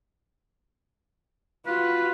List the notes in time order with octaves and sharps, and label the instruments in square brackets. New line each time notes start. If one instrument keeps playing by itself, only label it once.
[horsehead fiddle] F4 F#4 [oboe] B4